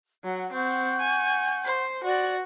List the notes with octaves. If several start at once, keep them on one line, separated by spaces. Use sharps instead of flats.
F#3 F#5
C4 F#5 C#6 G6
G#5
C5
F#4 D5